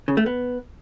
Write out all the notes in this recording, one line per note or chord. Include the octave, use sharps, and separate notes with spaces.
C#3
A3
B3